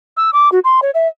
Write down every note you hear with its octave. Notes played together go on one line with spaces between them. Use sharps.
E6
D6
F#4
C6
C#5
E5